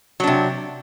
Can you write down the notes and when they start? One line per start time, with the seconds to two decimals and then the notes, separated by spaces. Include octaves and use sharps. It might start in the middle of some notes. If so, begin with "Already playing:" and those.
0.20 F#3
0.24 D4
0.27 C3